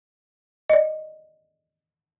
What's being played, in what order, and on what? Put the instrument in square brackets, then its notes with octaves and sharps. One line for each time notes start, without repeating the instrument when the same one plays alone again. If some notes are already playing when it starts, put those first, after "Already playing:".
[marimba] D5 D#5